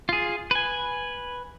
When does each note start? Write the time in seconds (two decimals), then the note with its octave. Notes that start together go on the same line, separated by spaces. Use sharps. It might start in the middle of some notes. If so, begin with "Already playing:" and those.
0.09 F4 G#4
0.51 B4 G#5